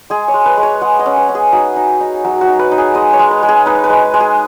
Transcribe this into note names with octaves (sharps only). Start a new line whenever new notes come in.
G#3 G#4
C#5
G#3
B4
G#3
C#5
G#3 F#5
D#5
C#4
B4
C#4
G#4
D#4 F#4
D#4
D#4
F#3 F#4
F#4
D#4
B4
D#4
G#4
G#3 D#5
C#5
G#3
B4
G#3
G#4
D#4 B4
B4
G#3
G#3
G#4